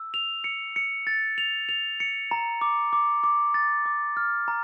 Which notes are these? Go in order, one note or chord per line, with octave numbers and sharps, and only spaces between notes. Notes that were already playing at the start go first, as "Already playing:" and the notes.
Already playing: E6
F7
C#7
C#7
A6
F7
F7
C#7
A#5
D6
D6
D6
A6
D6
F6
A#5